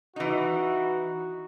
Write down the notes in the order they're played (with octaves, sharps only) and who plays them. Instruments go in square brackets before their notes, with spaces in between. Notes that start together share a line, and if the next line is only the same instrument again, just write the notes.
[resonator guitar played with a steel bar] E3 D#4 [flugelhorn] F#4